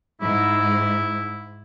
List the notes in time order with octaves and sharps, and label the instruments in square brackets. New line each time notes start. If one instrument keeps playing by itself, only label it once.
[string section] G#2 [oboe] E4